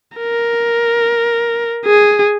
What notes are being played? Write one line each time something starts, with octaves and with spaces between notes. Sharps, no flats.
A#4
G#4